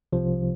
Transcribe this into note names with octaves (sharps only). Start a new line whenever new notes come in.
C2 C3 F3